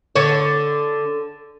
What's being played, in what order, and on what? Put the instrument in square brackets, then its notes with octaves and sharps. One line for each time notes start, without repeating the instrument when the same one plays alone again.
[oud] D3 C#5